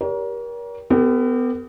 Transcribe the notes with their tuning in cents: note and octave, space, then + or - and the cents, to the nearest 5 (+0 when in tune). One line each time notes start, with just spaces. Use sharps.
G4 +5 A#4 +30 C#5 +45
B3 +30 G4 +15 A#4 -40